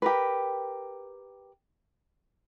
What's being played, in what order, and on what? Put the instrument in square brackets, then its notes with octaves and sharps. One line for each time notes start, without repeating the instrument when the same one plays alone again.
[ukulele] G4 A#4 B4